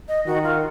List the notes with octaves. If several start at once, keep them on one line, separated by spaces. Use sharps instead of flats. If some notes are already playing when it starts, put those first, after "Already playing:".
D#5
D#3 F#4
F4